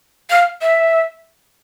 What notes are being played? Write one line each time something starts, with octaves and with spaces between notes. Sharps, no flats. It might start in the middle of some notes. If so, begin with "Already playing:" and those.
F5
E5